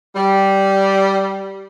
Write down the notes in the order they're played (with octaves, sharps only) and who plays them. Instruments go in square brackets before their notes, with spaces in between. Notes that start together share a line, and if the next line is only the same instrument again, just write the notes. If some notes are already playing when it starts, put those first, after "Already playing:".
[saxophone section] G3